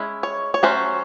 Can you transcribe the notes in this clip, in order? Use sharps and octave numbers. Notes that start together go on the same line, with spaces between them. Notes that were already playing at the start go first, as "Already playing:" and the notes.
Already playing: G#3 C#4 E4
C#5
C#5
F#3 A3 C#4 C5